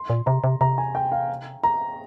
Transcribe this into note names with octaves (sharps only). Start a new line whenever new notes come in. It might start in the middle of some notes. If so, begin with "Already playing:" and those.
Already playing: C6
A#2
C3 A#5
C3
C3 A#5
G#5
G5
F5
A#5